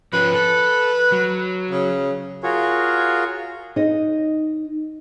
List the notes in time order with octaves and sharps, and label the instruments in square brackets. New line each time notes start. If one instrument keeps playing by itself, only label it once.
[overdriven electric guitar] F3 C#4 [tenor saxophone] B4
[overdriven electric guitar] A4
F#3
[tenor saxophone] C#3
[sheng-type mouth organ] F4 F#4 G#4 A#4 C#5
[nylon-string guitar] D#4 D#5